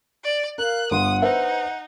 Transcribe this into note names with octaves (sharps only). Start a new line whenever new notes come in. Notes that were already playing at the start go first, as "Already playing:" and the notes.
D5
A#4 F5 F#6
G1 F#5 C6 D#6
D#4 B4 C5 E5